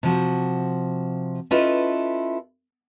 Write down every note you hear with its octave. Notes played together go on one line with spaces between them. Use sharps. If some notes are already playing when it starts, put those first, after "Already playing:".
C3 F3 F#4
C#4 E4 F4 A4 B4 D#5